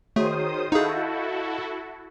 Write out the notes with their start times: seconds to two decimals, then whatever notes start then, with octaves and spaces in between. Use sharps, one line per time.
0.16 D#3 A3 F#4 G#4 C5 C#5 D#6
0.72 D#4 E4 F#4 G#4 A4 D#5 F5 G6